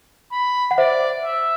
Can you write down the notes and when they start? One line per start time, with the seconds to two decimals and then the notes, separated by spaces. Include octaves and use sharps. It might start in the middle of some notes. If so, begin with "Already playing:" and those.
0.32 B5
0.71 F#5
0.78 C5 D5 E5
1.24 E5